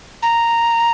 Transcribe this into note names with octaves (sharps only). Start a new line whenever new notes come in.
A#5